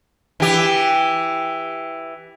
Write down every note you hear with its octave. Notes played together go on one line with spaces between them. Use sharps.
E3 G4